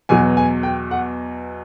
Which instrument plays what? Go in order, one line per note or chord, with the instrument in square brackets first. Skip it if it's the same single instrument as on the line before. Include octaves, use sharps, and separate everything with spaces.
[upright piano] E2 B2 F#3 G#5
G#5
G5
F#5